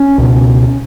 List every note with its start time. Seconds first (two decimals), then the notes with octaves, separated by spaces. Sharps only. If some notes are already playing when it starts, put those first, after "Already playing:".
Already playing: C#4
0.18 C#2 B2